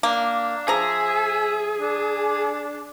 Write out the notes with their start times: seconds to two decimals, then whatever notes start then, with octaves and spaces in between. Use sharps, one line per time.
0.03 A#3 D4
0.68 F3 G#4 E5 A#5
1.78 D4